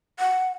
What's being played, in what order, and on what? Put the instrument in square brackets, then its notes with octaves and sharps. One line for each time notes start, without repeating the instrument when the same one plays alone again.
[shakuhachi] F#5